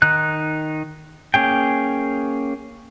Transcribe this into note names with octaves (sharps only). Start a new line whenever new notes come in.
D#3 D#4 F#6
A#3 C#4 G#4 G5